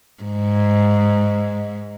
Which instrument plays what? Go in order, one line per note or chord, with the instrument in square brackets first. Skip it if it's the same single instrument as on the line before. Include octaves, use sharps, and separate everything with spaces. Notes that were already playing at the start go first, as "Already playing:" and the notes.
[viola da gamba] G#2